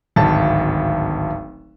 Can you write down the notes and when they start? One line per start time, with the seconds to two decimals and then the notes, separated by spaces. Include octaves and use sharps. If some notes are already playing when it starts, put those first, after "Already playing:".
0.16 D1 G#1 A5